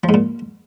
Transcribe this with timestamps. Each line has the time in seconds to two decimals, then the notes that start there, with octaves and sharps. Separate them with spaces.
0.04 F3
0.09 G#2
0.14 A#2